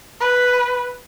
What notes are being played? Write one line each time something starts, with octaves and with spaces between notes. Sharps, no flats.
B4